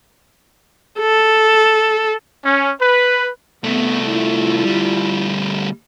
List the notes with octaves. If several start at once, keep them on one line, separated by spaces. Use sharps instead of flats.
A4
C#4
B4
C2 A3 B3
E4 F4
D2 G3